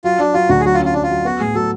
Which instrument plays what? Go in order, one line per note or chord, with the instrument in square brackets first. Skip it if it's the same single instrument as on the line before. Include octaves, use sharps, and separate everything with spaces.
[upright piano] F#3 [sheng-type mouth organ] F4
[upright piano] F#3 [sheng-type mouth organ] D4
[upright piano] F#3 [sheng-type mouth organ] F4
[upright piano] D2 [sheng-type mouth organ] F#4
[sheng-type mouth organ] G#4
[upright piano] F#3 [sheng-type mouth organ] F#4
[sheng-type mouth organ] F4
[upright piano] C#4
[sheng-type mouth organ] F4
[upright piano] F#3 [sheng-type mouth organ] D4
[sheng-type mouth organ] F4
[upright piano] F#3
[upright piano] B3 [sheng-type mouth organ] F#4
[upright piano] A2 [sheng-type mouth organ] G#4
[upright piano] F#3 [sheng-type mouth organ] A4